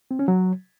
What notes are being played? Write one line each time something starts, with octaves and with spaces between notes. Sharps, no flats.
C4
C#4
F#3